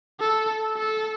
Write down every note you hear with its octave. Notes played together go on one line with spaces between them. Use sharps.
A4
A4